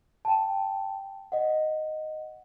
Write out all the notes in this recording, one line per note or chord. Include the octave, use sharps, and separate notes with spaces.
G5 A5
D#5 F#5